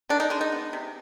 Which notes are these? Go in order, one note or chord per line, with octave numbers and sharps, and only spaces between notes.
D#3 D4
D#4
G#3 D4
D#4
B3
C3